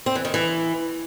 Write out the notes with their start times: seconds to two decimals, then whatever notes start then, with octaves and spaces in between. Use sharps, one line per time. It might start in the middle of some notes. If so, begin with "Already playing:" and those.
0.06 C4
0.15 E3
0.25 D#3
0.34 E3